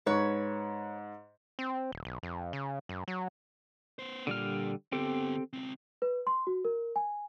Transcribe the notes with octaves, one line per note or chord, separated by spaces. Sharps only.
G#2 B4 C#5
C4
D#1
B1
F2
C#3
F#2
F#3
B3 C5
A#2 D3 G3 F6
D3 B3 C4 G4 A4
C#2 C4
B4
C6
F#4
A#4
G#5